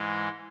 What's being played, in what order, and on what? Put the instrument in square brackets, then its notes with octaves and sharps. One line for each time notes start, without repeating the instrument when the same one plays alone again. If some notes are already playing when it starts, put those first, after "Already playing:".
Already playing: [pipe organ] G#2 E3 G#3